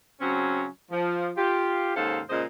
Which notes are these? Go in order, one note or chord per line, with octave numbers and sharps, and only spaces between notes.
C#3 F#3 C4 C#4
F3
F4 G4
D#2 G#2 C#3 A4 C5 F5
A#2 C#3 G#3 C5 D#5